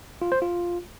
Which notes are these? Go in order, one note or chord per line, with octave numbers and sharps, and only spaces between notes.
F4
C5
F4